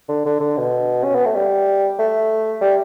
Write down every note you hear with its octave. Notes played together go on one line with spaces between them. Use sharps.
D3
D3
D3
B2
C#4
B3
A3
G3
A3
G3